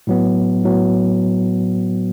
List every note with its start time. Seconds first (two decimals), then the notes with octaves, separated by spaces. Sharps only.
0.07 A2 F#3 B3
0.64 A2 F#3 B3